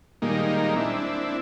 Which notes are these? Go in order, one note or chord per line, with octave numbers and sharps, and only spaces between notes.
A#2 D#3 G3 G#3 A#3 D#4
C4 D4 E4